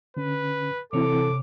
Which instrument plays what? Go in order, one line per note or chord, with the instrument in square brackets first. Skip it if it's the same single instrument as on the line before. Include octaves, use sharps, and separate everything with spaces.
[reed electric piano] D3 C#4 [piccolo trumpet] B4
[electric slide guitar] C3 C#5 [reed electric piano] E3 C4 E4 [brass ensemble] A4 [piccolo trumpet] D6